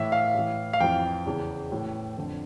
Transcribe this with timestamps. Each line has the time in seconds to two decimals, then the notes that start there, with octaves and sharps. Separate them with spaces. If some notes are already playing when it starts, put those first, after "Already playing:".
Already playing: A2 E3 E5
0.12 F5
0.34 A2 E3
0.73 F5
0.80 F2 E3 G5
1.26 E2 C#3 E3
1.72 A2 E3
2.17 F2 D3